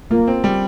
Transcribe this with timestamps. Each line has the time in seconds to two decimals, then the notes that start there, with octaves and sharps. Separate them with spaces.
0.11 A#3 F4
0.27 C4
0.44 G3